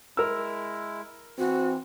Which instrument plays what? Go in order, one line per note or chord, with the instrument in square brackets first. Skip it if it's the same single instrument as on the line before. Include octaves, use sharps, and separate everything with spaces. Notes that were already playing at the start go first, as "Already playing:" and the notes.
[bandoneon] G#3 E4 [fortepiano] A#4 E6
[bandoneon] E3 [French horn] C4 [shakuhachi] F#4